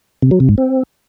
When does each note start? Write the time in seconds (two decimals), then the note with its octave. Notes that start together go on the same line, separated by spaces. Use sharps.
0.22 C3
0.31 F#3
0.40 C3
0.49 G#2
0.58 C4